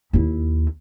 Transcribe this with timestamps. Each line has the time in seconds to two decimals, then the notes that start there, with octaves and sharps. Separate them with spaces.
0.13 D#2 E4